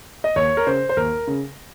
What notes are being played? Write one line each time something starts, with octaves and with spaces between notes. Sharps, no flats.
D#5
D#2 C#5
A#4
C#3 C5
C5
D#2 A#4
C#3